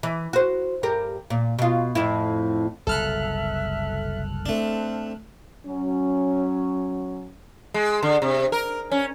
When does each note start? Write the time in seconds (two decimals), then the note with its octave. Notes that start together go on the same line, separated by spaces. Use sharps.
0.03 E3
0.33 F#4 C5
0.83 G2 G4 A#4
1.30 A#2
1.59 B2 F4
1.95 F2 A2 E4
2.87 F#1 C2 B2 A4 E5 F6 F#6
4.46 A3 C4 D4
5.67 F#3 C#4
7.74 G#3
8.03 D3
8.22 C3
8.52 A#4
8.92 C#4